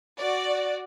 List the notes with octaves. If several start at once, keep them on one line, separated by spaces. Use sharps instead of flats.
F#4 D5